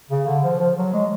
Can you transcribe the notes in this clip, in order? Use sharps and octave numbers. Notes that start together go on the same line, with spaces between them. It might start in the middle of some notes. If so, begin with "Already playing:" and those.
C#3
D3
F3
F3
F#3
G#3